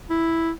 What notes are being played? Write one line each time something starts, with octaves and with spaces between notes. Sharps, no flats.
E4